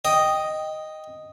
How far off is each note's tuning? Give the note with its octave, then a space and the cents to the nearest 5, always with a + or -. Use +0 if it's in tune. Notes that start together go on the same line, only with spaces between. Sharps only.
D#5 +0 G5 +0